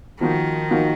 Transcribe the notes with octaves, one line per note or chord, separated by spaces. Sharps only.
D#3 F3 A#3 D#4 F#4
F3 A#3 D#4 F#4